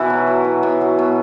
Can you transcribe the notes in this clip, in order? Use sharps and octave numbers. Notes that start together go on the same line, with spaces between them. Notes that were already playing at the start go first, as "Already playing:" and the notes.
Already playing: B2 E3 E4 F#4
F#3
F#3
B2
B2
F#3
B2